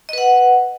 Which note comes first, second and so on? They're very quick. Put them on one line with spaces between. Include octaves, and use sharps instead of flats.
D#5 B4 F#5